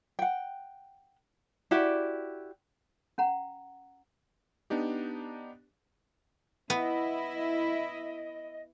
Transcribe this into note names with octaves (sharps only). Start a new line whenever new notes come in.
F#5 G5
E4 F#4 G4 D5
C#4 F#5 A#5
B3 D4 D#4 G4
B3 E4 D#5